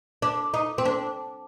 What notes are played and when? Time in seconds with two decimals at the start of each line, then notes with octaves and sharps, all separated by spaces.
0.22 D4
0.54 D#4
0.78 C4
0.85 D4